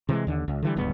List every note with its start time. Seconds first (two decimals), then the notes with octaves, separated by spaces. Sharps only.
0.09 C3 E3 G3 G#3
0.27 D#2 D3
0.48 C#2
0.62 D3 E3 G3
0.76 D1 C#2 G2 B3